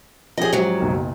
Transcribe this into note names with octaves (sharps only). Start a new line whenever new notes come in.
F3 C#4 G4 G#4 D#5
G#2 F#3
F#1 B1 D#3